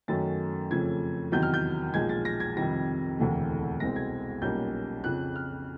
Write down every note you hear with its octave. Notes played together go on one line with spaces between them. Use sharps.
F#2 D#3 F#3 A3 C#4 A6
F2 C#3 F3 A3 G#6
E2 C3 D#3 F#3 G6
F6
G6
B1 A#2 F3 G#3 G#6
A6
A#6
G#6
F2 C3 D#3 G3 A#6
E1 D2 C3 E3 A3
C2 B2 G#3 C4 A#6
G#6
B1 A#2 G3 A#3 C#4 G6
F2 C#3 F3 F#6
F6